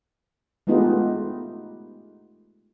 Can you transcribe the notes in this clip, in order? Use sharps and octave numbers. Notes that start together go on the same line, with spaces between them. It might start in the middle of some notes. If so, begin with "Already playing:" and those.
G#3 A3 B3 D#4 F4 G4